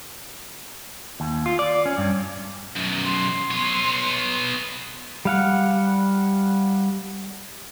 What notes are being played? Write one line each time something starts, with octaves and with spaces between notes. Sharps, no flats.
D#2
F4
D5
C#4
G2
F#2 B2
C6
B3 C#5
G3 F5 F#5